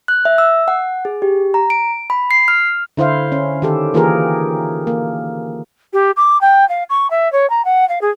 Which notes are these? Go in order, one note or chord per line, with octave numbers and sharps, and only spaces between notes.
F#6
E5
E6
F#5
G#4
G4
A#5
D7
B5
C7
F6
D3 E4 C5 F5
C#4
D#3 G4 A4
E3 A#3 F4 G4 G#4 A#4
A#3
G4
D6
G5
F5
C#6
E5
C#5
A#5
F#5
F5
G#4